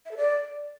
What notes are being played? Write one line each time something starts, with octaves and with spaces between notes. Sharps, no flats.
E5
A4
D5